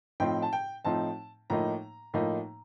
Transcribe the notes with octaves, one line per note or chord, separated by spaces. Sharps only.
A2 F3 C4 D#4 G5
A5
G5
A2 F3 C4 D#4 A5
A2 F3 A#3 D#4 A#5
A2 F3 A#3 D#4